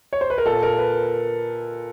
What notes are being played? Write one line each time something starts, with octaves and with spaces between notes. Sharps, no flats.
C#5
C5
B4
A#4
A#2 A4
A#4
B4